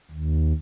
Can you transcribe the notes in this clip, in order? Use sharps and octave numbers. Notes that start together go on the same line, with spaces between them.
D#2